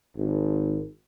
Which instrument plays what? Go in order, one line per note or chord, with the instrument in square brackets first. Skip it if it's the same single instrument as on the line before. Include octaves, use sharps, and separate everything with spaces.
[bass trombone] G#1